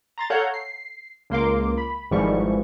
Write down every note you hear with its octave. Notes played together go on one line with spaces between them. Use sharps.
A#5 C6 A6
A4 C#5 F5 F#5 A#5 G6
C7
C#2 A#3 C6 D6
B5
G#1 G#2 E3 F3 G3 C#6